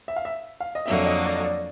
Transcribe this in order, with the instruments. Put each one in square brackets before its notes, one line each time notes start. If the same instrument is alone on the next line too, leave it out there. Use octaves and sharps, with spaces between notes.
[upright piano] E5
F5
E5
F5
D#5
[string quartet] F2 D3 F#3 A#3 [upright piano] E5
[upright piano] D#5
D5
D#5
D5